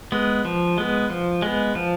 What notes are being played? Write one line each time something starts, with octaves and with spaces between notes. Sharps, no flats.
G#3 B3
F3
G#3 B3
F3
G#3 B3
F3